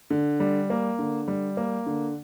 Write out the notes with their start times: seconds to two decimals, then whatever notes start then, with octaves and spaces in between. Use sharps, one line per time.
0.11 D3
0.40 G3
0.70 A#3
0.99 D3
1.28 G3
1.57 A#3
1.86 D3